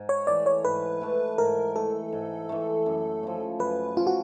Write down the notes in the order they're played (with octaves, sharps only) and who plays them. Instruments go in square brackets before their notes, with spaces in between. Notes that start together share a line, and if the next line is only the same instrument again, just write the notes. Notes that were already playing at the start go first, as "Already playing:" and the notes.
Already playing: [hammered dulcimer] G#2
[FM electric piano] C#5
[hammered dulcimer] E3 A3 [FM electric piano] D5
[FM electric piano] C#5
[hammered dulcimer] G#2 [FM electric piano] B4
[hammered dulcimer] E3 A3
[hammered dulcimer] G#2 [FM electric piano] A#4
[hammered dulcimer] E3 A3 [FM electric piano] A4
[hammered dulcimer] G#2
E3 A3
F#2
C#3 F3
[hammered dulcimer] F#2 [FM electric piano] B4
[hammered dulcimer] C#3 F3 [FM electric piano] F4
[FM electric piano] F#4